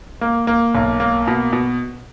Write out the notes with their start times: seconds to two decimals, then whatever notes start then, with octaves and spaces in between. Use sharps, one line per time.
0.21 A#3
0.47 A#3
0.75 B1
1.00 A#3
1.27 B2
1.53 B2